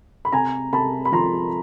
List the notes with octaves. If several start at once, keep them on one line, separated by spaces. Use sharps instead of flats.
B5
C3 G#5 A#5
C3 A5 B5
B5
F3 A#5 C6